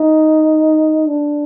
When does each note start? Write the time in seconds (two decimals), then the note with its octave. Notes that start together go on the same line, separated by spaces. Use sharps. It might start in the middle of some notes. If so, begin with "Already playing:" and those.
Already playing: D#4
1.07 D4